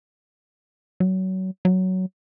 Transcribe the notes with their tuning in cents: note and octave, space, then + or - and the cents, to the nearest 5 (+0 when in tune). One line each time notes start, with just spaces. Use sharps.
F#3 +25
F#3 +10